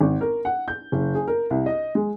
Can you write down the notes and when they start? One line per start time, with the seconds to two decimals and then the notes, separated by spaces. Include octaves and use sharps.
0.01 G#1
0.21 A#4
0.45 F#5
0.68 G6
0.92 F#1
1.15 G#4
1.28 A#4
1.50 C2
1.66 D#5
1.95 G#3